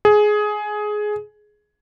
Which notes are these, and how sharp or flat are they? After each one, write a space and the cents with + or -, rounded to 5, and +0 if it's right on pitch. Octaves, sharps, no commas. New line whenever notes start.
G#4 +15